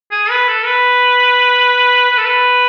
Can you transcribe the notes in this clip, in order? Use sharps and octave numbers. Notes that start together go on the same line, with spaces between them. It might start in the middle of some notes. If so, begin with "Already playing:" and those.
G#4
B4
A4
B4
B4
A4
B4